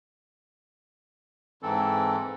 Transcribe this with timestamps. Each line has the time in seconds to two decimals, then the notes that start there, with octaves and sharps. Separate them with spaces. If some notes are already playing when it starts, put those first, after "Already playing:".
1.62 G#2 E3 C4 A4